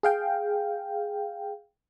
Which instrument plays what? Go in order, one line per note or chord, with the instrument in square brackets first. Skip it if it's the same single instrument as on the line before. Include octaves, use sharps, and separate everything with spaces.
[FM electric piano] G#4 F5 G5